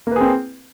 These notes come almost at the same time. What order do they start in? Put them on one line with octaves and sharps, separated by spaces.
A#3 B4 G#4 C4